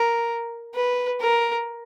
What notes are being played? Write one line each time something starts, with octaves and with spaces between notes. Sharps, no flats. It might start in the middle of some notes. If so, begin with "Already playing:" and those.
Already playing: A#4
B4
A#4